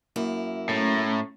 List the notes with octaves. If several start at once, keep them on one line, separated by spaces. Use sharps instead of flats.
F#2 A#3 E4
A2 A3 C#4 A#5